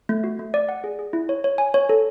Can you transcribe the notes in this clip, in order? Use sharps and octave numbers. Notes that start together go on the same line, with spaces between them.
A3
F#4
A3
D5
F#5
G#4
G#4
E4
C#5
C#5
G#5
C#5
A4